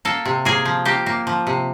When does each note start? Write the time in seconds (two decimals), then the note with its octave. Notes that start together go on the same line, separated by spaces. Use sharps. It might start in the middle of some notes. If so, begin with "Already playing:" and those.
0.05 A#3 A4
0.25 C3
0.45 A#3 G#4
0.65 F3
0.85 A#3 G4
1.06 A#3
1.27 F3
1.47 C3